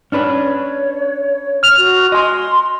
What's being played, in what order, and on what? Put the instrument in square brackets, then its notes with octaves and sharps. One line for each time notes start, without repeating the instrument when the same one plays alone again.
[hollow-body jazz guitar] C#4 D4 B4 [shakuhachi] C#5
[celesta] F6 F7
[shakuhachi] F#4
[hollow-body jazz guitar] D#5 G#5 [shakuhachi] C6